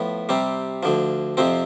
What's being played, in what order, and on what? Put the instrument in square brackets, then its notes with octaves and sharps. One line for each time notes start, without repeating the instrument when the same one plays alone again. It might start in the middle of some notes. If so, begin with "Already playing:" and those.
Already playing: [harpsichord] A2 F3 B3
C3 G3 C4
D2 D3 F3
F2 C3 F3 C4